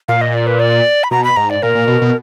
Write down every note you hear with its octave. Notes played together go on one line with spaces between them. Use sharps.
A#2 F5
D#5
D5
B4
D5
B5
B2 A#5
B5
G#2 A#5
D5
A#2 A#4
A#2
B2
B2